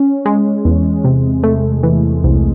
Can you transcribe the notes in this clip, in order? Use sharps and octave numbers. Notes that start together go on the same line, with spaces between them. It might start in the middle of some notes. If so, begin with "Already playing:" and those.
Already playing: C#4
G#3
E2
C3
A3
E3
C2